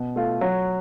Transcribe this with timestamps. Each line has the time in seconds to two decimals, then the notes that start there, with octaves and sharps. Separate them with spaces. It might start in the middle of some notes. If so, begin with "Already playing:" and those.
Already playing: B2
0.16 A3 F4
0.41 F#3